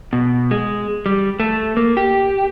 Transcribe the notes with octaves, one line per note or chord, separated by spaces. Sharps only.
B2
G#3
G3
A3
A#3
G4